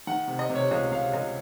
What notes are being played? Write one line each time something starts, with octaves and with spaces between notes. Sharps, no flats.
D#3 F#5
C3
D#5
C3
C#5
C#2 D#5
C3 F5
C#2 D#5